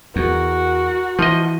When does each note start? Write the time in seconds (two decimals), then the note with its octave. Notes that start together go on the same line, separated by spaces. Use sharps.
0.16 E2 F#4 A#4
1.19 E3 F3 D#5